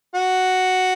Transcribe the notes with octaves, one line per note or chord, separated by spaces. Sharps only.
F#4